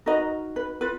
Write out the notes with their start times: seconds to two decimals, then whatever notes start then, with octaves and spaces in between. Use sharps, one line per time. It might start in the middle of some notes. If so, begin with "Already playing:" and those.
0.06 D#4 F#4 A#4 B4 D#5
0.56 B4
0.81 F4 B4